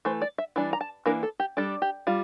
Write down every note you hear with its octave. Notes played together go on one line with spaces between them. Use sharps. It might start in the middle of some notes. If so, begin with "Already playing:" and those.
E3 A3 C5
D5
E5
E3 G3 D4
A#5
A5
E3 A#3 D4 A#4
A4
G4
G3 D4 A4
G4
G3 F4